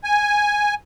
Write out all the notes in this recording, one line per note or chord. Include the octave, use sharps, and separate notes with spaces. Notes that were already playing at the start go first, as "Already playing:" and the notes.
G#5